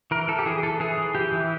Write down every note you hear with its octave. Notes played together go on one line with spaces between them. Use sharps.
E3 A#4
E3 A4
G4
E3 G#4
E3 A4
E3 G#4
E3
E3 G4
E3